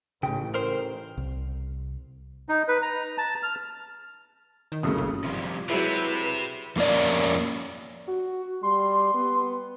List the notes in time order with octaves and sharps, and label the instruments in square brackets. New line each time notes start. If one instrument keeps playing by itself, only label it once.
[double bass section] A1 [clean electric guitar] C#3 [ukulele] D#4 F4 G5
[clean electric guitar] A#4 C5
[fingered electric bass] C2
[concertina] D#4
B4
A#5
A5
F6
[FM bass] D#3
[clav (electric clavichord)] C2 F#2 [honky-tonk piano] C#3 A3 D#6
[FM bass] G1
[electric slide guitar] C3 F3 G3
[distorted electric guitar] C3 [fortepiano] F#3 G#3 [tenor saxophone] E4 [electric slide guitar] B4
[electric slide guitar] F2 A#3 C#4 D5
[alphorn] F#4
[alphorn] G3 [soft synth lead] C6
[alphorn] B3